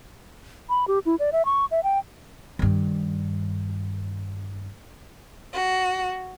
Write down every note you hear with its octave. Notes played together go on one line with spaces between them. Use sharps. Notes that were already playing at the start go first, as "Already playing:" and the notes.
B5
G4
E4
D5
E5
C#6
E5
G5
G2 D#3
F#4